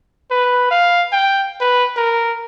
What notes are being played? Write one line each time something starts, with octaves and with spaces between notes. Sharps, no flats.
B4
F5
G5
B4
A#4